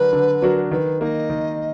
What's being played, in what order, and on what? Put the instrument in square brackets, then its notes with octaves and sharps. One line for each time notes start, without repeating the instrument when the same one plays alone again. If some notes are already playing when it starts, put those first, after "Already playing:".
Already playing: [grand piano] D3 F#3 D4 F#4 A#4 [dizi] B4
[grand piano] D3
F#3 D4 F#4 A#4
[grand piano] D#3 [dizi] B4
[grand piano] A#3 D#4 [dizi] D#5
[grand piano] D#3